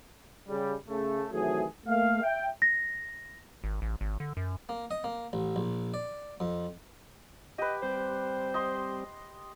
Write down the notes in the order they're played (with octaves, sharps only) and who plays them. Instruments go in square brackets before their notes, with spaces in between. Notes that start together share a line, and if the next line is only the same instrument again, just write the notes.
[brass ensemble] C#3 G3
C#3 A3
C3 D#3 E3 F#3 A3 G#4
A3 A#3 F5
E5 G5
[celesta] A#6
[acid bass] G#1
A1
G#1
D3
F#2
[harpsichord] A#3
D#5
A#3
A1
A#1
D5
F2
[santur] G4 B4 [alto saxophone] D#5
[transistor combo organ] G3 C4 [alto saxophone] C5
[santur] D#5 C6